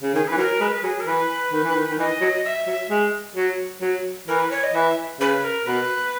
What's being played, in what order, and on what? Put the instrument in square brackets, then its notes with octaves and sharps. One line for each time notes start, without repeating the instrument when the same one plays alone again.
[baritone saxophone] C#3
[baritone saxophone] D#3 [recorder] G#4
[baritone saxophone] E3 [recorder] B4
[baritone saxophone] F#3 [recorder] A#4
[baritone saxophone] G#3 [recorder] B4
[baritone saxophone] F#3 [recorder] G#4
[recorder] A#4
[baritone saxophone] E3 [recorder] B4
[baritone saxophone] D#3
E3
D#3
D#3
[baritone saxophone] E3 [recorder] D#5
[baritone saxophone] F#3
[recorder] E5
[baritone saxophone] F#3
G#3
F#3
F#3
[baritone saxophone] E3 [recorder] A#4
[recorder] B4
C#5
D#5
[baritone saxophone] E3 [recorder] E5
[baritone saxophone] C#3 [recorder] B4
[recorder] A#4
[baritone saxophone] B2 [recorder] B4